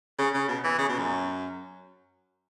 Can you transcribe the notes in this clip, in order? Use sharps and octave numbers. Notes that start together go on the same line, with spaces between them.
C#3
C#3
B2
E3
C#3
B2
F#2